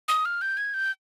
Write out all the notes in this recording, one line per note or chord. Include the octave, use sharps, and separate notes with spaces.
D#6
F6
G6
G#6
G6